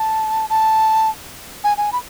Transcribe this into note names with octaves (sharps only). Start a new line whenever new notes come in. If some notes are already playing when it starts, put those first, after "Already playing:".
Already playing: A5
A5
G#5
G#5
B5